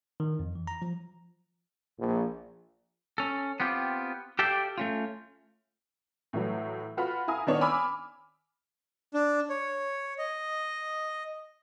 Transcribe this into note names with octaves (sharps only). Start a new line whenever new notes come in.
D#3
F2
E3
A#5
F3
A#1
C#4 A4
B3 C4 F4 G4
G4 A4 D5 E5 F5 G5
A3 C#4 F4
A2 E3 F#3
F4 F#4 B4 F#5 B5 F6
E4 F5 G#5 A#5 D#6
D#3 B3 D4 C#5
G#5 B5 D6 E6 F6
D4
C#5
D#5